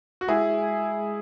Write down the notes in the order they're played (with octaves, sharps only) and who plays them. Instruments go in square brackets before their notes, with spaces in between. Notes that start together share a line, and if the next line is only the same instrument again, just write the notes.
[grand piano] F#4
[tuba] G#3 [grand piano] E4 G#4